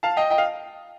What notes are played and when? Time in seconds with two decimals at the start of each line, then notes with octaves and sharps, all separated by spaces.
0.03 F5 A5
0.17 D#5 G5
0.30 D#5 G5
0.38 F5